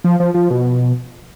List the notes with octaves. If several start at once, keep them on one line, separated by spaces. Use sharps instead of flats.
F3
F3
F3
B2